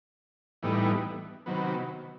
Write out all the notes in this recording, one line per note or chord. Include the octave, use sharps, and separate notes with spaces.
A2 E3 G3 B3 D#4
C3 D#3 F#3 B3